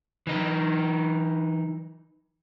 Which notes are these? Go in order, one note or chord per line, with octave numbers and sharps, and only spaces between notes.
E3 D#4